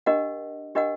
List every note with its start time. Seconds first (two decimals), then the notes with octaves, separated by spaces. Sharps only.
0.06 D4 G4 A#4 D#5 F#5
0.75 D4 G4 A#4 D#5 F#5